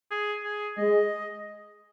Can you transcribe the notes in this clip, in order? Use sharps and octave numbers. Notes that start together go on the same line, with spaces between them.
G#4
G#4
G#3 D#5